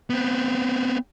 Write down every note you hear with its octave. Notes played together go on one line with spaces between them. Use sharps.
B3 C4